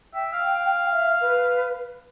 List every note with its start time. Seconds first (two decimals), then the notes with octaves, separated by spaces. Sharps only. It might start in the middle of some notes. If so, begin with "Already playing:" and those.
0.14 E5 G5
0.33 F5
0.92 E5
1.21 B4